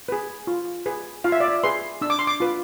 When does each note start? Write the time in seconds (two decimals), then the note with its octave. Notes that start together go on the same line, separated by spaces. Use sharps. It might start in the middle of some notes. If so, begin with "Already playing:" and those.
0.09 G#4 B4
0.47 F4
0.86 G#4 B4
1.24 F4 F5
1.32 E5
1.40 D5
1.48 E5
1.63 G#4 B4 C6
2.01 D4 E6
2.10 D6
2.19 C6
2.27 D6
2.40 F4 B4